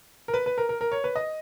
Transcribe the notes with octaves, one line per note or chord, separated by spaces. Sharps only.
A#4
B4
B4
A#4
A#4
A#4
C#5
B4
D#5